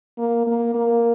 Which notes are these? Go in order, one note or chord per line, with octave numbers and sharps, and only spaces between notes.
A#3
A#3
A#3